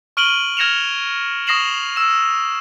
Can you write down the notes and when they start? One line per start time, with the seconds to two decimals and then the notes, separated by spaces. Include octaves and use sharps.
0.17 C#6 F6 D7 D#7 F#7 G7
0.57 F6 G#6 A#6 C#7 E7 F7
1.47 C#6 D#6 A#6 C7 E7 F#7
1.96 E6 E7